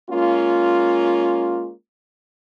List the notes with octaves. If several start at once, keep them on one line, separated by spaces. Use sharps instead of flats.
G#3 A#3 C#4 F4